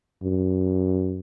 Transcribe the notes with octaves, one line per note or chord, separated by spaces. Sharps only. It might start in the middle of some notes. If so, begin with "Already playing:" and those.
F#2